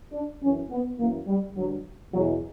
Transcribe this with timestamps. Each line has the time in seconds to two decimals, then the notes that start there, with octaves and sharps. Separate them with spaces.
0.12 D4
0.41 F#2 E3 C#4
0.70 B3
0.99 F#2 E3 A#3
1.27 G3
1.56 G2 D3 F#3
2.13 B2 F#3
2.17 E2